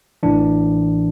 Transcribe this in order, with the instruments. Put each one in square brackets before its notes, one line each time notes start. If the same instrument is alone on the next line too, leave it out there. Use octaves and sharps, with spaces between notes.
[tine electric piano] A1 A2 E3 D4